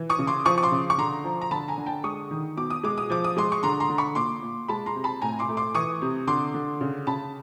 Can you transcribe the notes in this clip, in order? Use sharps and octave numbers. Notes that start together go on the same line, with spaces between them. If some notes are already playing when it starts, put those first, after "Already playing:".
Already playing: E3
C#6 D#6
C#3
C6 D6
F3 C#6 D#6
C#6
C6 D6
C#3
C#6
D3 A#5 C6
F3
A#5
D3 A5 B5
G#5 A#5
D3
G5 A5
G#3 C#6 D#6
D#3
B2 D6
D#6
G#3 D6
D#6
F3 D6
D#6
G#3 C6 D6
C#6
D3 A#5 C6
A#5 C6
D3
B5 C#6
A#2 C6 D6
A#2
G#3 A5 B5
A#5 C6
C3
A5 B5
A2 G#5 A#5
C6 D6
A3
C6 D6
E3 C#6 D#6
C3
D3 C6 D6
D3
C#3
C#3 A5 B5